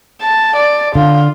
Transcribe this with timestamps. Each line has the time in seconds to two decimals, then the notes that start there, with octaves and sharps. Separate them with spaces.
0.21 A5
0.56 D5
0.95 D3 F4